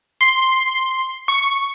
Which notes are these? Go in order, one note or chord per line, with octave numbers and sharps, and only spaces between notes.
C6
C#6